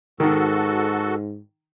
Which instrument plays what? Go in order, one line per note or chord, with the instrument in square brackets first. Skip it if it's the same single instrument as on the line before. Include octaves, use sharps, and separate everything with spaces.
[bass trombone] G#2 [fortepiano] D#3 [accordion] F#4 A4